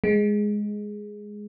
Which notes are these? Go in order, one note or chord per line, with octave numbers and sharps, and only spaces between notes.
G#3